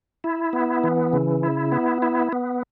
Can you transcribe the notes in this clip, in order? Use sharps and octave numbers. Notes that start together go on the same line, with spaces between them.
E4
B3
E3
C#3
E4
B3
E4
B3